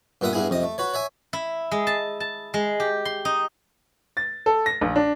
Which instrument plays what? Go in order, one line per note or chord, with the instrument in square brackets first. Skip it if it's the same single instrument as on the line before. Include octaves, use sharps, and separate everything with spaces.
[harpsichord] G2 A#2 B3 E5 F#5 D#6
G2 B3 E4 G#4 G#5
F2 C3 D#5
A3
F#4 B4 C#5
C#5 E5 G#5
[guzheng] E4
G#3
A5
A5
G#3
G4
C6
D#4
[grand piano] A6
A4
A#6
A#1
D4